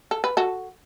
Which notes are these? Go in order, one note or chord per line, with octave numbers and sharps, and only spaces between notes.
A4
B4
F#4 A4